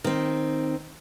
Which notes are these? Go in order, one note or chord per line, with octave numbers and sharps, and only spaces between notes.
D#3 C4